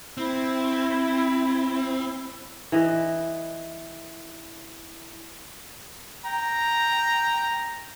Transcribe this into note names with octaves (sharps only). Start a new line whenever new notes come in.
C4 E4
E3 D#5
G5 A#5